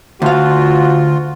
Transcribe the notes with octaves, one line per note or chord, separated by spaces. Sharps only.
D2 F4 F#4 F5